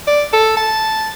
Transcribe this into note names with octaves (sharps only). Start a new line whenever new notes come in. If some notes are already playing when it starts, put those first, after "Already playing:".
D5
A4
A5